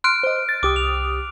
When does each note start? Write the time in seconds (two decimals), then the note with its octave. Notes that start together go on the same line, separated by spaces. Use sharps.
0.04 C6 F6 F#6 D7
0.23 C5 D#5
0.49 A6
0.63 C2 G4 D6 D#6
0.76 F7